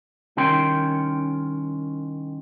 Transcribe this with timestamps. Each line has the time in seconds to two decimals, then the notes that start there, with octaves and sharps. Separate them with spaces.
0.37 C2 D#3 C#4 A#4 G5 C6